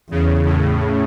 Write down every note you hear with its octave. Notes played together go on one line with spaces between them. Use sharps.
E2 C#3
A2